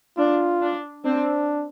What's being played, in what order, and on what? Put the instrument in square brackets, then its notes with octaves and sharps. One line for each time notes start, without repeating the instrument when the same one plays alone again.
[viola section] D4 [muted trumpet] F4
[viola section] D4
[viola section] C4 [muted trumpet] D4